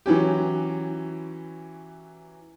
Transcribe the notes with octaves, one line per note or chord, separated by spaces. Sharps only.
E3 F#3 C#4 G4